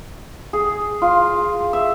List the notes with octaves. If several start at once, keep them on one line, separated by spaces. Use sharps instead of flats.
G#4
F4
E5